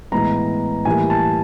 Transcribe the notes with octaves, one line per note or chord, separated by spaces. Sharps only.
A2 E3 G#3 B3 A#5
A2 E3 G3 A#3 G#5
A5